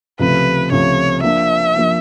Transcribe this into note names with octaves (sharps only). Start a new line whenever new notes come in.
C#2 C3 F3 A3 B4
C#2 C3 F3 A3 C#5
F3 A#3 D4 E5
F3 A#3 D4